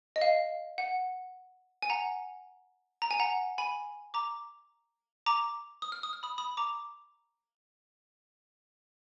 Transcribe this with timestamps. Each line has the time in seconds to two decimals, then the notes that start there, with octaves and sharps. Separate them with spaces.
0.16 D#5
0.21 F5
0.78 F#5
1.82 G#5
1.90 F#5 A#5
3.02 A#5
3.11 G#5
3.19 F#5 A#5
3.58 G#5 B5
4.14 A#5 D6
5.26 A#5 D6
5.82 D#6
5.92 F6
6.03 D#6
6.13 F6
6.23 B5 D#6
6.38 B5 D#6
6.57 A#5 D6